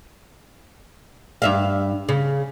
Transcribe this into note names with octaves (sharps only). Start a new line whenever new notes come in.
G2 E5 F5
C#3